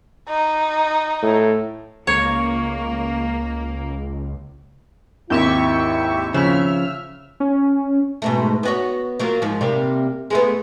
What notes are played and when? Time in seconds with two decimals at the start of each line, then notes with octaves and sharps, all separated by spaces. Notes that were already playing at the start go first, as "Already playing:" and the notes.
0.29 D#4
1.23 A2
2.07 C#2 A#3 C#5
5.30 G#1 D#2 E4 G4 E5 C#6
6.34 C#3 F3 E5 F6
7.40 C#4
8.22 G#2 B2 A3
8.63 B3 F#4 C#5
9.19 F#3 A#3 F4
9.42 G#2 F3
9.61 C3 G3 A#3
10.30 G#3 A3 B3